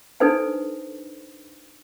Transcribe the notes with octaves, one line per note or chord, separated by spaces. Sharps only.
D4 D#4 A4 B4 C5 G#5